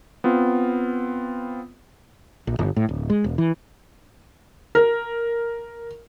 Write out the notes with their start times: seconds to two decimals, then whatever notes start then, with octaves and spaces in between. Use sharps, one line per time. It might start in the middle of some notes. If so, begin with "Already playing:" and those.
0.24 B3 C4 F4
2.47 A#1
2.59 G1
2.76 A2
2.89 D1
3.10 G#3
3.24 E1
3.38 E3
4.75 A#4